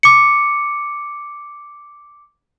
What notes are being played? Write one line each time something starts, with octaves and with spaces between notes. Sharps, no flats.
D6 C#7